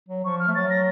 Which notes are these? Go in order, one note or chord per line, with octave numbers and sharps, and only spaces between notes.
F#3
F3 C#6
F6
A3
F#3 A6
A#6